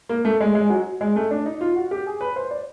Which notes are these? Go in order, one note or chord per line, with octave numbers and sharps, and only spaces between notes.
A#3
A3
G#3
G#3
F#3
G#3
A3
D4
D#4
F4
F#4
G4
G#4
B4
C5
D5